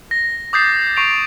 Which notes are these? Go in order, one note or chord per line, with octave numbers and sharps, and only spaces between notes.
A#6
D6 D#6 G6 A6 C7
C#6 C7 D7 F7